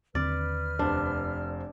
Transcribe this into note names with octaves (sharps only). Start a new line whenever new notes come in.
D#2 D3 C4 B4 D5 F6
F1 D4 C5